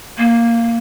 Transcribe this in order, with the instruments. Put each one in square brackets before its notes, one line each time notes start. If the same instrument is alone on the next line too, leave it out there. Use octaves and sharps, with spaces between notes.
[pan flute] A#3